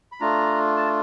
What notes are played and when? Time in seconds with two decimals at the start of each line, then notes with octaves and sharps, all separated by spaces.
0.12 B5
0.20 A3 D4 F4 A#5
0.76 A5